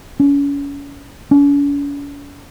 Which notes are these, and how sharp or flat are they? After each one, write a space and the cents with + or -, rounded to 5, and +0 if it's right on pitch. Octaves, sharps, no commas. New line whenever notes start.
C#4 +35
C#4 +45